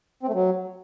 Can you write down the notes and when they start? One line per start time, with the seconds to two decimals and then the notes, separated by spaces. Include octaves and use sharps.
0.23 C4
0.28 A3
0.34 F#3